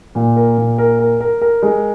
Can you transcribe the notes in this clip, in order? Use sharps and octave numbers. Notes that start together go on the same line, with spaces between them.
A#2
A#4
A#2
A#4
A#4
A#4
A#4
G#3